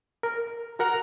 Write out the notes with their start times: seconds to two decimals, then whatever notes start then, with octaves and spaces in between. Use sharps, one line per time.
0.23 A#4
0.79 F#4 A#4 F#5 A#5